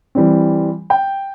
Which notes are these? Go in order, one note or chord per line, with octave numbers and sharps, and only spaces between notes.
E3 G3 C4
G5